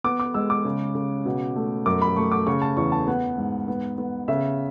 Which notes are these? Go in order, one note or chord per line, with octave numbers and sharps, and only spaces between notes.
B3 D6
D6
G#3 E6
D6
C#3
C#3
B2
A3
F#2 D6
B5
A3 C#6
D6
C#3 C#6
A5
E2 C#6
A5
B3 F#5
G#2
B3
B3
C#3 E5